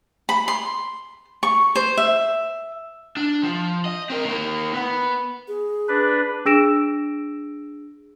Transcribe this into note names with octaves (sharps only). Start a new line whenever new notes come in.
B5
C6
C#6
C5
E5
D4
F3
D#5
C4 A#4
A#3 D#4
B3
G#4
D4 B4
D4 G#4 E6 A#6 D7 E7